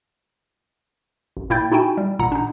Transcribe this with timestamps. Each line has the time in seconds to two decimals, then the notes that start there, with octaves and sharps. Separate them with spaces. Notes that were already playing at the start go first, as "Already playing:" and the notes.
1.37 A1
1.50 A#2 A#3 E4 G5 G6 A6
1.72 D#4 E4 F#4 G5 G#5
1.97 G3
2.19 A1 A#2 F#5 A#5
2.32 D4 D#4